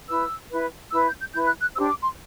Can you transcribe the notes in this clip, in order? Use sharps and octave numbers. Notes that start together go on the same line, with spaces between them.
E4 B4 E6
E4 B4
E4 B4 E6
G6
G6
E4 B4 G6
F#6
F#6
D4 G4 C5 E6
D6
C6